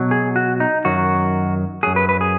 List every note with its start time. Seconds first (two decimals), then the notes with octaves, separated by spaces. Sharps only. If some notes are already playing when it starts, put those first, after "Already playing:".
Already playing: B2 F#3
0.11 G#4
0.36 F#4
0.60 D#4
0.85 F#2 D#3 F#3 F#4
1.83 F#2 F#3 G#4
1.96 B4
2.09 B4
2.21 G#4